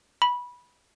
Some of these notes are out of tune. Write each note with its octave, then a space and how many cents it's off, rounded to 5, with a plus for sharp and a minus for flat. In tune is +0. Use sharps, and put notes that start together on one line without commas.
B5 -15